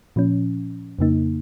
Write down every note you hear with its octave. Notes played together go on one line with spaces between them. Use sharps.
A#2 F3 C#4
F2 C#3 A#3 D#4